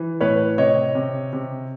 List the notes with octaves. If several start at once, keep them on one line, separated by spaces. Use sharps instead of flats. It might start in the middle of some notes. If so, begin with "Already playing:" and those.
Already playing: E3
A2 B4 C#5
C3 C#5 D#5
C3
C3